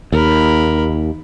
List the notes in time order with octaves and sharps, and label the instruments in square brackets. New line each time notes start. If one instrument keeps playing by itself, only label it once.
[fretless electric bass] D#2 [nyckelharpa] A#4 B5